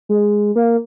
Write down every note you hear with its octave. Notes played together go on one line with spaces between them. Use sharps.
G#3
A#3